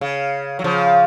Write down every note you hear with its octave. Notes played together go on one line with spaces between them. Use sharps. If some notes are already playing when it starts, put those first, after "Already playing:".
C#3
F#3
C#3 F3